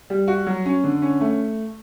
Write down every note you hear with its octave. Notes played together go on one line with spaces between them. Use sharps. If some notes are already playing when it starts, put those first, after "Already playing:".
G3
F#4
F#3
C#4
D3
C#4
A3